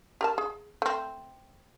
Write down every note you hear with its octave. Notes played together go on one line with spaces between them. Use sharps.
G4 A#4 A5
G#4
A3 C4